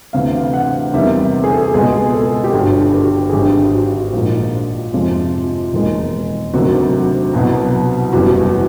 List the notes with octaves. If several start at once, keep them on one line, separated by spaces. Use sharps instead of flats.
D2 C3 E3 F5
F#5
E2 C3 D#3 G3 E5
G#4
A4
C#2 B2 G#3 G#4
A4
G4
G1 G2 D3 F#4
G4
G#4
G#1 G2 D3 G4
F#4
F#4
A#1 G#2 D#3 G#3
F2 C3 F3 G#3 F4
E1 D#2 D#3 G#3
D2 C3 D#3 F#3 F#4
C2 B2 F#3
F#1 E2 C#3 E3 G3 F#4